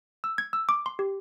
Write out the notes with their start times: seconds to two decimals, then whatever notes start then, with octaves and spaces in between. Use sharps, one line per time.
0.24 E6
0.38 G#6
0.53 E6
0.69 D6
0.86 C6
0.99 G4